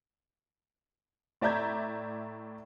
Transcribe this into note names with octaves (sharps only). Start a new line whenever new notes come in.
A2 D5 E5 A#5 G6 G#6